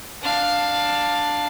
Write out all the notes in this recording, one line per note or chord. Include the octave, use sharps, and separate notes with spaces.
D4 F5